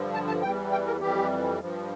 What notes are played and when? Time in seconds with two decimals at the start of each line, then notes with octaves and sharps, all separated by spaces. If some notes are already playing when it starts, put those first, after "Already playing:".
Already playing: G2 D3 F3
0.14 A5
0.28 A5
0.42 E2 E3 G3 G5
0.72 G5
0.86 A#4
1.01 F2 E3 G3 G4
1.60 G2 F3